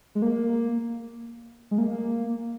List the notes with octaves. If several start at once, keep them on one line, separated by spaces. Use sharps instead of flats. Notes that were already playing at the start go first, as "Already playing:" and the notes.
G#3
A#3
G#3
A#3